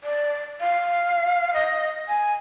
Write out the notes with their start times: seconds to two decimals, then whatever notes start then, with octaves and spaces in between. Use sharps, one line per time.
0.04 D5
0.61 F5
1.54 D#5
2.08 G#5